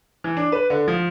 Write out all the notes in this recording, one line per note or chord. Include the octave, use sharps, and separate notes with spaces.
E3
D4
B4
D3
F3